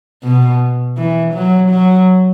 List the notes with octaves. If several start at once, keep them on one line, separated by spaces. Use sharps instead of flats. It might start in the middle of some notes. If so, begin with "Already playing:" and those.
B2
E3
F#3
F#3